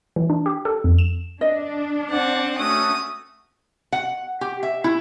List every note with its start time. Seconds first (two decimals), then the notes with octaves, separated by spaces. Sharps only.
0.16 E3
0.30 D4
0.46 G4
0.65 A4
0.84 F2
0.99 E7
1.41 D4 D#5
2.10 C4 D5 F#5
2.58 A3 C#4 F#4 D#6
3.93 F#5
4.41 G4
4.63 E5
4.84 E4